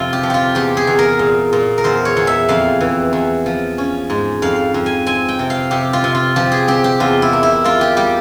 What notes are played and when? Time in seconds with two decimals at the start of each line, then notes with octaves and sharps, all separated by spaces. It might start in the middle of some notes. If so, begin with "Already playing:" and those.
Already playing: F2 C3 F4
0.13 G4
0.23 F3
0.30 F4 G4
0.55 E2 G4
0.77 G#4
0.87 E2
0.99 A#4
1.19 A#2
1.53 A#2
1.78 A#4
1.84 E2 C5
2.05 C#5
2.17 E2
2.27 E5
2.49 F2 F5
2.81 E3
3.13 E2
3.46 F3
3.78 C#4
4.10 G#2
4.42 F2 F5
4.74 F2
4.86 G#5
5.06 C4 G#5
5.28 G5
5.39 C3
5.50 F5
5.71 C3 G4
5.93 F4
6.04 C3
6.15 F4
6.36 F3 G4
6.52 G#4
6.68 C4 G4
6.84 G4
7.00 E2 F4
7.22 E4
7.33 A#3
7.43 E4
7.64 A#3 F4
7.81 G4
7.97 G3 G4